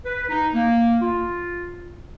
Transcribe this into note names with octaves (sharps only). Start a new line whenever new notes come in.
B4
D#4
A#3
F4